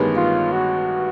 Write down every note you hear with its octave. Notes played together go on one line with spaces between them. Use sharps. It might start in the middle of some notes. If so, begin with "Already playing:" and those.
Already playing: A1 G2 D#3 G#3 B3
F4
F#4